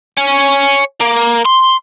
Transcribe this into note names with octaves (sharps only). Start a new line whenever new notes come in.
C#5 G#5
A#3
C6